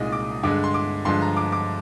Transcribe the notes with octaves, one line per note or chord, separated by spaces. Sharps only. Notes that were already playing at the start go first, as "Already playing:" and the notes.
Already playing: C2 A#2 G#3 D#4 D#6
D6
G2 D3 G#3 D6
C6
D6
G2 D3 F3 G#3 C6
A#5
D6
D6